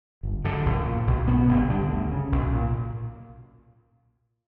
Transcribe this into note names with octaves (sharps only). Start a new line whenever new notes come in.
G1
F#2 D3
A#1
A#2
B1
B2 B3
G1
G2 D3
D2
C#3
B1
A#2